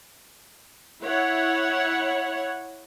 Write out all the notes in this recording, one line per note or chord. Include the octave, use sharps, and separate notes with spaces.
E4 C#5 F#5